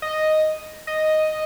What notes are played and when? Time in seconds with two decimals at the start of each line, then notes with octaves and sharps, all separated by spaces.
0.02 D#5
0.87 D#5